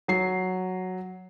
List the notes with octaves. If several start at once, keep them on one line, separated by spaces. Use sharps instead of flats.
F#3 C7